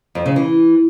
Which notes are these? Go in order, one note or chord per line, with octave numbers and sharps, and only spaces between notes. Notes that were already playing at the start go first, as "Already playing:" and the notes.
F2
C#3
E3